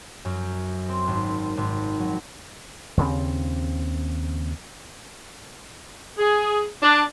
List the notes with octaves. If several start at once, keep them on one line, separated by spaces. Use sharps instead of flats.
F#2
C4
G#1
G#1
F#3
D#2 C#3 C4
G#4
D4